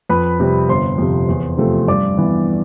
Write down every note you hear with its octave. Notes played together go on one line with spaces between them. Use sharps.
F2 B4 B5
C3 G3 C4
G1 C5 C6
F2 C3
E2
C3 F3 A3 C4
G2 D5 D6
E3 B3